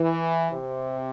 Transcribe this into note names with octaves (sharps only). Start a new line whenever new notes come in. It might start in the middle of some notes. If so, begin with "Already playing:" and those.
Already playing: E3
C3